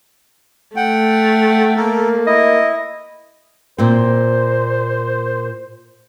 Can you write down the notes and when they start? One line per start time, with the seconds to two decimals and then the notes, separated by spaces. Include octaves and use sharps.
0.76 A3 F#5 G5
1.76 A#3 A4 A#4
2.27 E4 D#5
3.78 A#2 C4 C5